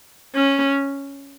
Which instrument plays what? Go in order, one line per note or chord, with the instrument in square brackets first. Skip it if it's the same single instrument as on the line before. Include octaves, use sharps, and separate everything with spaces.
[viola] C#4